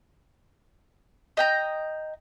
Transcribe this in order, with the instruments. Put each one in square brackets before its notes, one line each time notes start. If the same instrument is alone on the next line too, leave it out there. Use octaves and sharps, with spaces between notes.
[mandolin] D#5 G5 A#5